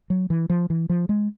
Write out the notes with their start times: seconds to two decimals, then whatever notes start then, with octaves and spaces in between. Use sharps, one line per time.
0.10 F#3
0.30 E3
0.50 F3
0.70 E3
0.89 F3
1.09 G#3